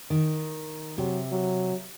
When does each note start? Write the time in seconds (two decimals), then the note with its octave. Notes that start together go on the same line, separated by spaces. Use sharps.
0.10 D#3
0.98 C3 F#3
1.32 F#3